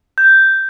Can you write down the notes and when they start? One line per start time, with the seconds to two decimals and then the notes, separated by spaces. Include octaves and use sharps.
0.18 G6